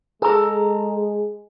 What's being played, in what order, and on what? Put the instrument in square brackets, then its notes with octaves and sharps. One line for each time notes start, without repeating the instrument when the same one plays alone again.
[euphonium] G#3 [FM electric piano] G#4 [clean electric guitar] A4 A#5